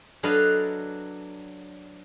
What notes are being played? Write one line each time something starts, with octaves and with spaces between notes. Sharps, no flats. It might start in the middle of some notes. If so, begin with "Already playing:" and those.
F#3 D4 A4 B4 D#5 F5